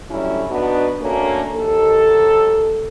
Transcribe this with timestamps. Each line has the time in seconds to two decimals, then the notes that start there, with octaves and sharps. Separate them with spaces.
0.10 G2 F#3 A3 C#4 E4
0.49 B3 D4 D#4 F#4 B4
1.00 A3 A#3 C#4 D4 F#4
1.54 D#2 A4